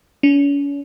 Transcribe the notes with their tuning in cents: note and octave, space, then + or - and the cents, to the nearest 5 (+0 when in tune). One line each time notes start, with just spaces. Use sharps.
C#4 +40